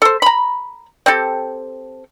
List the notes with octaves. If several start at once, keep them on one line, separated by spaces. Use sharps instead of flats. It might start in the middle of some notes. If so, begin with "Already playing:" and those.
A4 C5
A#5 B5
C4 G4 A4